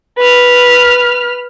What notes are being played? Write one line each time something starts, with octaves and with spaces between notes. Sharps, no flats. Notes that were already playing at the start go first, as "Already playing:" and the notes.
B4 F6